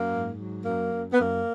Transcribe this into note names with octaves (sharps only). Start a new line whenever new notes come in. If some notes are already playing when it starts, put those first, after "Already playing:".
Already playing: F#2 A#3
G#2
F#3
F#2 A#3
F#2
B3
F#2 A#3